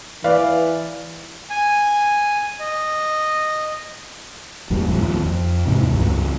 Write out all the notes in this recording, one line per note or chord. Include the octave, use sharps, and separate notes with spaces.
E3 B4 D5 F5
G#5
D#5
F#1 E2 A#2 G3
F#2 A2 F3
D#2 F3
F2
D#2 G#2 C3 E3
C#2 G2 G3